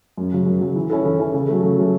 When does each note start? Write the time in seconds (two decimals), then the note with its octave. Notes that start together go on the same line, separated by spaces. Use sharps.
0.17 F#2
0.32 C#3 F#3
0.46 F#2
0.61 C#3 F#3
0.76 E3
0.90 C#4 E4 A4
1.05 E3
1.19 C#4 E4 A4
1.34 C#3
1.48 F#3 A3
1.63 C#3
1.78 F#3 A3